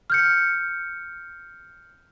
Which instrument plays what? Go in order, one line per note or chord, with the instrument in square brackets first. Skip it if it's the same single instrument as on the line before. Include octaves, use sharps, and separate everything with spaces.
[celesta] F6 G6 C#7